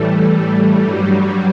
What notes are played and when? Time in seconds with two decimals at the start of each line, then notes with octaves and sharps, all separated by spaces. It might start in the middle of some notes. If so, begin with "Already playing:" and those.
Already playing: A2 E3 G3 A3
0.75 G2 F#3 G3